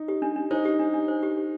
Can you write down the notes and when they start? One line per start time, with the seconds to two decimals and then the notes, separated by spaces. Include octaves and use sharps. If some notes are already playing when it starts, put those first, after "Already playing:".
Already playing: D#4
0.08 G4
0.22 D4
0.36 D4
0.51 D#4 C5
0.65 G4
0.79 D4
0.94 D4
1.08 C5
1.23 G4
1.37 G4